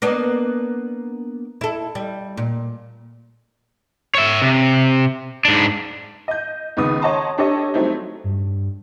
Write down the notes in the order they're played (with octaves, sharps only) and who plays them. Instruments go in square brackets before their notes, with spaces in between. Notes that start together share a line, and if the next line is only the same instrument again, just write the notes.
[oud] A#3 B3 D4
E4 A4
G3
A#2
[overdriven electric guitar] C#5 E5
C3
G#2 D4
[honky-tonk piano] D#5 G6
C#2 D#3 B3 D#6
C#5 D#5 F#5 A5 A#5 C6
D4 G4 A4 C#5 D#5
F#3 G3 A3 C4 D#4
[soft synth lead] G2